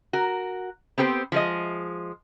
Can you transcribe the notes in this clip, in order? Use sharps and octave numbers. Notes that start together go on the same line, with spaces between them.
F#4 A#4
B3 C4 G4 A#4 C5
F3 G#3 D#5